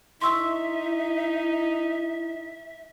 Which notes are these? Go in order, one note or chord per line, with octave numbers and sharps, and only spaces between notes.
D#4 E4 E5 C6 C#6 E6